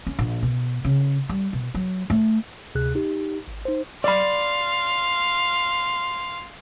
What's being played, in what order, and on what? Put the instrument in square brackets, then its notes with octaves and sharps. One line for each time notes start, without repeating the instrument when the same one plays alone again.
[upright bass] C#4
A#1
B2
C#3
G3
B2
F#3
A3
[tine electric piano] D2 C3 G#4 F#6
D#4 G4
G#1
D#4 C5
[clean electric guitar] D5 B5 [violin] F5 [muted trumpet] C6